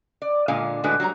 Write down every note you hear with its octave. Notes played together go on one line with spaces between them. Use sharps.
D5
A#2 D3 G#3 F5
A2 D3 G#3 D4 F#4 B4
F#3 G3 F#4 A#5